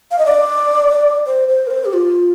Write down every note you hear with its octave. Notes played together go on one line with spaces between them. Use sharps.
F5
D#5
D5
C5
C5
A#4
C5
G4
F4